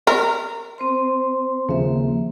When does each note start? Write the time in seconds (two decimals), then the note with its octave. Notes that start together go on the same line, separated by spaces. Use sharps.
0.07 A#4
0.78 C4 C5 C6
1.69 D#2 C#3 F3 A#3 E5